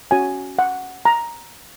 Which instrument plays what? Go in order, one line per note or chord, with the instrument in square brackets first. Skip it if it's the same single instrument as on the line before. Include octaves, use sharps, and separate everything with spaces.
[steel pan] C#4 F#4 C#5 G#5
F#5
A#5